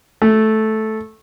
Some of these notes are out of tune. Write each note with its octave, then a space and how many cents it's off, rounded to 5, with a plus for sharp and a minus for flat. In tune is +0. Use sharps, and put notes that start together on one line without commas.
A3 -10